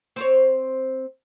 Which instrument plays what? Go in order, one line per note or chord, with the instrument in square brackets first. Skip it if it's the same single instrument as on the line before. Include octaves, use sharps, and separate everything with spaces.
[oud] C4 C5 C#5